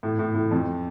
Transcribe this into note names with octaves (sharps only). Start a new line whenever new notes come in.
A2
A2
A2
F2